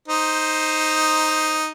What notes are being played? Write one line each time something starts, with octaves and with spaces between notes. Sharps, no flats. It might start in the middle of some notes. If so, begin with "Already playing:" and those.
D#4 C5